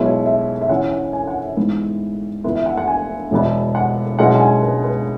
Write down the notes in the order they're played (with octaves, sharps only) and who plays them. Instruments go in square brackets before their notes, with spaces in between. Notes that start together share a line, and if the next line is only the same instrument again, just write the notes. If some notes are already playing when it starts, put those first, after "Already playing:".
Already playing: [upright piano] B1 B2 G#3 B3 E4 C#5
E5
E5
E2 E3 C#4 E4 F#5
F#5
G#5
F#5
E5
G#2 E3 B3 E4
E2 E3 B3 E4 B4
E5
F#5
F#5
G#5
E1 E2 B2 B3 E4
F#5
B1 B2 G#3 C#4 E4 F#5
F#5
G#5
B4
B4